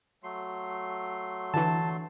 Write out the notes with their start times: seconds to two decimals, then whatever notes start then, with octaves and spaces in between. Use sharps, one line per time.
0.23 F#3 A3 C6
1.54 D3 E3 A5